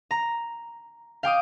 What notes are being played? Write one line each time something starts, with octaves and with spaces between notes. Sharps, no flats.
A#5
F5 G5 D6 D#6